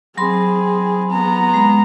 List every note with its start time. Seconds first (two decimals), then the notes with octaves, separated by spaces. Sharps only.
0.18 F#3 C4 G#4 B5 C6
1.11 B3 A#5
1.54 G#3 B5